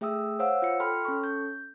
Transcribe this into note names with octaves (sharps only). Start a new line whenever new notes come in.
A3 G#4 E5 G5 D#6 E6
C5 C#5 F5 F#5 E6
F4 C#7
A4 G5 B5 C6 F6
C#4 A4 C#6
G6